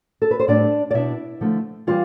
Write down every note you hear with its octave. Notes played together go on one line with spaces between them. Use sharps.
A4
B4
C5
A2 G3 C4 D4 D5
D5
B2 B3 D4 E4 E5
D3 F3 A3
E3 G3 F4 F5